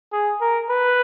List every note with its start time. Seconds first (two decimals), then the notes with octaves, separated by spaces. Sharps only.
0.12 G#4
0.41 A#4
0.70 B4